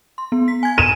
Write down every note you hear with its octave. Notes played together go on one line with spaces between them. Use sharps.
C6
B3
B6
G#5 G#6
D#7 E7